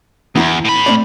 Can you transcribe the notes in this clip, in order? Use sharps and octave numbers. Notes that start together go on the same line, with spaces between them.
E2 B3 E4 A#5
A2 B5
A3 C4 D5